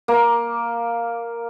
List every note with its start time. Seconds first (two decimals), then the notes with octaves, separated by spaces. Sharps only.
0.08 A#3